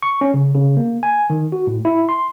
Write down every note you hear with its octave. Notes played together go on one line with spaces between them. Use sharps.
C#6
C#4
C#3
C#3
A#3
G#5
D#3
F#4
A2
E4
C6